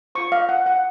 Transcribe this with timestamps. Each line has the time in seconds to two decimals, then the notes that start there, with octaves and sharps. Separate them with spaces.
0.15 F4 C5 C#6
0.32 F5
0.49 F#5
0.66 F#5